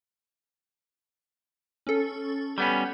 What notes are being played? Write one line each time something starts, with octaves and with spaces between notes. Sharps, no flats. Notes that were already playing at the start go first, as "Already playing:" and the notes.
C#4 A4
G3 B3 C#4 B5